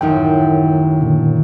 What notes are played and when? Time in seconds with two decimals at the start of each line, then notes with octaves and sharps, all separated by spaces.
0.01 A1 F#2 D#3 D#4 G5
1.02 A#2 D3